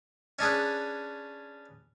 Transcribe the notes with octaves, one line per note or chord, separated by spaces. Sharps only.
C#4 D4 G#4 B4